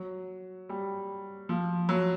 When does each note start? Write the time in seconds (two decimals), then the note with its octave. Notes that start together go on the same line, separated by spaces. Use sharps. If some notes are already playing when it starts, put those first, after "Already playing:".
Already playing: F#3
0.69 G3
1.49 F3
1.89 F#3